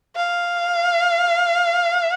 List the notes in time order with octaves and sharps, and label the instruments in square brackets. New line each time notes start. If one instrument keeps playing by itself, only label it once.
[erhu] F5